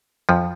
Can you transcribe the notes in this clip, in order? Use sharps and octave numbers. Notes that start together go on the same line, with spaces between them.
F2 F3